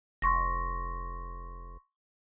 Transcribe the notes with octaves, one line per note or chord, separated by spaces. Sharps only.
F1 C6 C#6 A#6